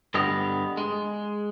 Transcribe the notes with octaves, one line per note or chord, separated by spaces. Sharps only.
G2 D3 B3 G4 D#5
G#3